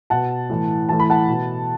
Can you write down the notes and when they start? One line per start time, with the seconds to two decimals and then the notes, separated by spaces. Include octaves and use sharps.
0.10 B2 F#5 A5
0.50 A2 E3
0.89 A2 E3 A5
1.00 B5
1.10 F#5 A5
1.28 B2